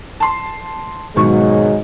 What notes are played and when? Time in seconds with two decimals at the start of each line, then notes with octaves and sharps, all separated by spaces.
0.20 A5 C6
1.16 G#1 B2 F#3 G#3 C#6